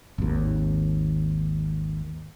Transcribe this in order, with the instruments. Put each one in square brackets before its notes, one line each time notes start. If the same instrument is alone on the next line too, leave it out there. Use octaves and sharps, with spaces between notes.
[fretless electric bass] G#1 D#2